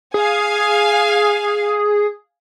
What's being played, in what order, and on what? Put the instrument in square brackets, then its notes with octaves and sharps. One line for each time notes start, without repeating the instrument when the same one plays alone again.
[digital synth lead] G#4 [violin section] F5 G#5